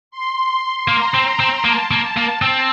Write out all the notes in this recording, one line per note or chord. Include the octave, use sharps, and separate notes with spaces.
C6
A#3 A#5
C4
C4
A#3 A5
A#3
A#3
C4